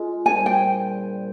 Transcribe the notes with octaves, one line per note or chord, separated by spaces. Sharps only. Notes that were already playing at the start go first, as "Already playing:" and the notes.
Already playing: G#3 F4
A#2 G3 D4 G#4 C5 G#5
G5